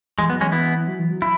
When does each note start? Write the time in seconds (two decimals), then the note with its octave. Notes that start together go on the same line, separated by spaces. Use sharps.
0.18 E3 G#3
0.29 F#3 B3
0.41 E3 G#3 C#4
0.52 B3 E4
0.88 F#3
0.99 E3
1.11 F#3
1.22 E4